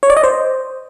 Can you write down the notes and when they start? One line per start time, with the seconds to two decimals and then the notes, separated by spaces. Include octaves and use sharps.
0.03 C#5
0.10 D5
0.17 D#5
0.23 C5